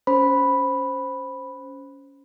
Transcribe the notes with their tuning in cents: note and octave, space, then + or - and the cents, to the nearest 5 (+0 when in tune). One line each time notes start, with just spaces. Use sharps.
C#4 +10 C5 +0 B5 +0